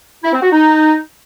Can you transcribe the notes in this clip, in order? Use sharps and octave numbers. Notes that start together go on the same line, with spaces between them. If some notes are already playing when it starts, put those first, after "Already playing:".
E4
C4
F#4
D#4